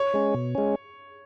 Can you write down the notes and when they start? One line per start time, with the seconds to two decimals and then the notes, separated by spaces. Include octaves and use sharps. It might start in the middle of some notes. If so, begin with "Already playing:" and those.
Already playing: C#5
0.14 G#3 C#4
0.34 B2
0.55 G#3 C#4